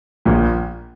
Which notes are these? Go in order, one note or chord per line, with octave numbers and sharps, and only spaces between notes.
A#1 A#2